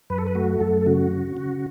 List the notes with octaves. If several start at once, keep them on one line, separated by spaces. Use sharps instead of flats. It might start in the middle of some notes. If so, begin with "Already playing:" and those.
F#2 B4
A4
B4
A3 F#4
F#2 A4
A4
C#3 F#4
C#3
C#3